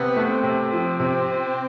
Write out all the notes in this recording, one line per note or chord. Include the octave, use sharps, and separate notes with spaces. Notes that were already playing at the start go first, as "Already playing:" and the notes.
Already playing: C3 B3
A3
C4
C3
F3
C3